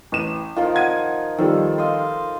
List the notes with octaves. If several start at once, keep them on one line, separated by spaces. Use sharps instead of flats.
A1 E7
D#3 F3 F4
F#5 G#6 D#7
D#3 F3 G3 A4
C5 D#5 F5